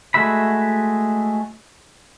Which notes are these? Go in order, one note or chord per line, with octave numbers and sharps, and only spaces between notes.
G#3 A3 F#4 E5 B5